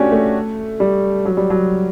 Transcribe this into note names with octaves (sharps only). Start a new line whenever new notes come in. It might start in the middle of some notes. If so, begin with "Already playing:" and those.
Already playing: A3 C#4 D4 F#4 G4
A3
G3
F#3
G3
F#3